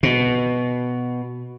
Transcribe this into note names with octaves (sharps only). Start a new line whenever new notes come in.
B2